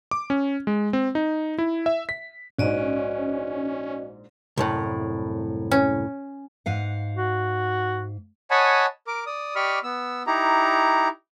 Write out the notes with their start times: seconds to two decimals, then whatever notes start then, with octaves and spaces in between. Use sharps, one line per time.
0.11 D6
0.30 C#4
0.67 G#3
0.93 C4
1.15 D#4
1.58 E4
1.86 E5
2.09 B6
2.58 A#1 G#2 C#4 F#4 D5 D#5
4.57 C2 F#2 A2
5.71 C#4
6.66 G#2 F5 F#5
7.17 F#4
8.51 C#5 D#5 F#5 G#5 A5 B5
9.07 A#4 D6
9.26 D5 D#6
9.56 G4 D5 D#5 B5 C#6 F6
9.84 B3 E6
10.27 D#4 E4 G4 A#5